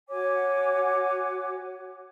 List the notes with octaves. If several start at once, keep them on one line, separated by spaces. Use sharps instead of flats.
F#4 C#5 G#5 D6